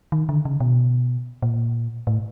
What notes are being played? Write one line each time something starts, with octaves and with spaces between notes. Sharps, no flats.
D#3
D3
C#3
B2
A#2
A2